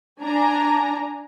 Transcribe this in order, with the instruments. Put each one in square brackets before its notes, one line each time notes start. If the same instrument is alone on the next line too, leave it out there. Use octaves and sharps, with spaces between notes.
[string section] D4 G#5 A#5